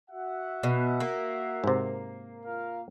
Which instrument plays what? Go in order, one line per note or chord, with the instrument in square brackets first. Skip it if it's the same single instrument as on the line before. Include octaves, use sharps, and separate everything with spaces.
[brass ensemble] F#4 E5 F#5
[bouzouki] B2
A#3
[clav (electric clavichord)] G#2 C3
[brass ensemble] F4 A#4 F5